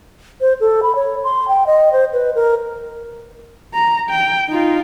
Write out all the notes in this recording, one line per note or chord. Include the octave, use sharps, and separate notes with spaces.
C5
A4
B5
C#5
C6
G5
D#5
C5
B4
A#4
A#5
G5
D#4 F4